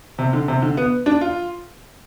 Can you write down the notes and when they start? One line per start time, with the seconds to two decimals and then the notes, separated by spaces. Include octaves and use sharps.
0.18 C3
0.33 D3
0.48 C3
0.62 D3
0.77 B3
1.06 D4
1.21 F4